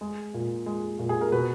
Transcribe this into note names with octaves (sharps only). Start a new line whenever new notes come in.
G#3
A#2
G#3
A#2
G#4
A#4
B2 B4